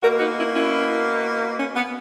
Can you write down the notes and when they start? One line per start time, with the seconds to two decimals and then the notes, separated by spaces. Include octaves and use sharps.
0.02 B2 A#3 F#4 A#4
0.20 D#4 F#4
0.37 C#4 E4
0.55 C#4 E4
1.59 C#4
1.76 B3